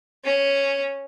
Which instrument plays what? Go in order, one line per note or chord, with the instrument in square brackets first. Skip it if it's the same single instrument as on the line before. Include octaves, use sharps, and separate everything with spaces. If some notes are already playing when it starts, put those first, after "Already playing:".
[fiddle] C#4